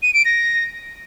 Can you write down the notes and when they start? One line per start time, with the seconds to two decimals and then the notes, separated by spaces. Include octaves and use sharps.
0.03 D#7
0.14 D7
0.25 A#6